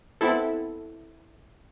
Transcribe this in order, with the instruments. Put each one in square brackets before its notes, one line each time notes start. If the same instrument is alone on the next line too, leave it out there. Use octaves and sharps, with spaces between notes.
[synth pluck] B3 C4 E4 A4